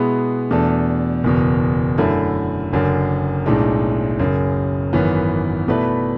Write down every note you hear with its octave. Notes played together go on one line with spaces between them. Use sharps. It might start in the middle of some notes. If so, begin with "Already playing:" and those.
Already playing: B2 G#3 B3 E4 G#4
E2 B2 A3 D4 A4
F#1 E2 B2
F#2 D3 A3 E4
F#1 F#2 D3
B1 A2 G#3 D4
F#1 F#2 C#3
G#1 F#2 E3 B3
B2 A3 E4 B4 D5